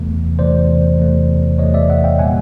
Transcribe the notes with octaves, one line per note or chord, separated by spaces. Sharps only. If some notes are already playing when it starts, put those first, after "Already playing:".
Already playing: E2 C3 E3 A3
E2 C3 E3 A3 C5 D5
E2 C3 E3 A3
E2 C3 E3 A3 C#5 D#5
D5 E5
E5 F#5
F5 G5
A#2 G3 A#3 F#5 G#5